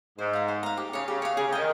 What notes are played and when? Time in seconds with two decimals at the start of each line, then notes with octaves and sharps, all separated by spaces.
0.19 G#2 C5
0.33 F5 A#5
0.48 C5
0.63 F5 A#5
0.77 G4
0.93 C#3 C#5 F5
1.08 C#3 G4
1.22 C#5 F5
1.37 C#3 G#4
1.47 C#3
1.52 D#3 D#5 G5